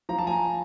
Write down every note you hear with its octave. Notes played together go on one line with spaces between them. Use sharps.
F3 A#5
A5
G#5 A#5